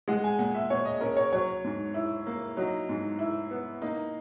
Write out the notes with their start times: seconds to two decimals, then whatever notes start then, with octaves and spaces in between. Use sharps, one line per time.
0.08 G#3 F#5
0.24 G#5
0.39 A#2 F#5
0.55 E5
0.70 A#2 C#5
0.85 D#5
1.01 C#4 A#4
1.17 C#5
1.33 F#3 C#5
1.64 G#2
1.94 E4
2.26 A#3
2.57 F#3 D#4
2.89 G#2
3.19 E4
3.51 B3
3.82 A#3 D#4